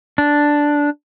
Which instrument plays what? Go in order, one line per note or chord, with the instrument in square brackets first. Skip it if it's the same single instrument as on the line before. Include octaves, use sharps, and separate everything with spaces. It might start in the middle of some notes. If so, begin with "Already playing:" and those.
[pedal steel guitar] D4